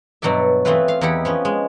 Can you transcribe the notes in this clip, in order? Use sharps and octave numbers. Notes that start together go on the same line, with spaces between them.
G2 B2 F#3 F#4 D5 E5
E3 A3 B3 C4 F4 B4
F5
E2 D#4 E4 G4 F#5
F3 B3 C#4
G#3